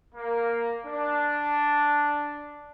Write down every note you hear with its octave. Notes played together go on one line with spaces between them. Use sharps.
A#3
D4